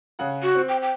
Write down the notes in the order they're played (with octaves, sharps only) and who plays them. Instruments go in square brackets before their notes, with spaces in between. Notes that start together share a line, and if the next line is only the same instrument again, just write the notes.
[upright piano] C#3 F#5 F#6
[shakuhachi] F#4
[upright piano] C4
[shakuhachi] G5
G5